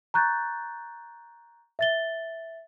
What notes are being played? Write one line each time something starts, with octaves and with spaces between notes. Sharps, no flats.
A#5 C#6 F#6 G6 A6
E5 A6 G7